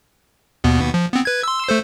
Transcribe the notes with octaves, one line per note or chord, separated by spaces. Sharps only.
D#2 B2 B3
F3
B3 C4
B4 G#6
C6 E6
A3 A4 C5